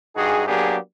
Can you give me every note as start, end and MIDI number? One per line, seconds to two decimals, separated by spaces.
0.16 0.44 43
0.16 0.44 63
0.16 0.44 66
0.16 0.44 68
0.48 0.77 54
0.48 0.77 58
0.48 0.77 59
0.48 0.77 62
0.48 0.77 67
0.48 0.77 68